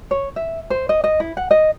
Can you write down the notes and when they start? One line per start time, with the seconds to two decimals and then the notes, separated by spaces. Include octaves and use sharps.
0.11 C#5
0.36 E5
0.70 C5
0.89 D#5
1.04 D#5
1.20 E4
1.37 F#5
1.51 D#5